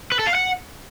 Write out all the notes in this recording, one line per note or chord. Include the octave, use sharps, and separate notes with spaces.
B4
A4
F5
F#5